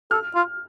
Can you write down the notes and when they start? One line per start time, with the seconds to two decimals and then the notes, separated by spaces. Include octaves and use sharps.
0.11 A4 F6
0.35 F4